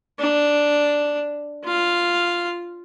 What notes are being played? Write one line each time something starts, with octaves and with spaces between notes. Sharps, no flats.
D4
F4 F5